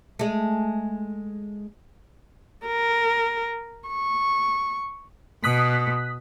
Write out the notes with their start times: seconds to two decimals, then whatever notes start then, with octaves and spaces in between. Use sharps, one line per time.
0.19 G#3 A3
2.67 A#4
3.89 C#6
5.44 B2 D#6 F#6 B6